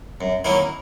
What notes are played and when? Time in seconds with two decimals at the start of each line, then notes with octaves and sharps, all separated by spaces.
0.21 F#2
0.45 D#3 F#3 A#3 C#4 E4